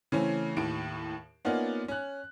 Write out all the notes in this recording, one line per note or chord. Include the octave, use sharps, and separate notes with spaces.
C#3 E3 A3 C4 C#4
D#2 A2 D7
A#3 B3 C#4 D#4 F4 D5
C#4 F#6